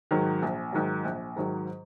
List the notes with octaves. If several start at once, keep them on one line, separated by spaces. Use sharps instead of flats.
G#2 D#3 F#3
A#1
G#2 D#3 F#3
A#1
G#2 D#3 F#3